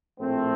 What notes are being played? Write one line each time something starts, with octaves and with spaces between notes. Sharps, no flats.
A#1 A2 A3 C4